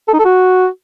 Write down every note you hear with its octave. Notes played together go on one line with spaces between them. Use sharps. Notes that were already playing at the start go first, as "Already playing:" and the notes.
A4
D#4
A4
F#4